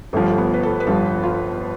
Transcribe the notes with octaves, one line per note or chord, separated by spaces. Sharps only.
G1 G2 F3 A3
A3
B3
B4
A4
B4
G1 G2 F3 A4
F4